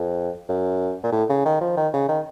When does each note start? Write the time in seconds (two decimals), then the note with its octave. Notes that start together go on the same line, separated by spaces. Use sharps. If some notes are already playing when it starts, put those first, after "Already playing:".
Already playing: F2
0.49 F#2
1.03 A#2
1.12 A2
1.29 C#3
1.45 D#3
1.61 F3
1.77 D#3
1.93 C#3
2.08 D#3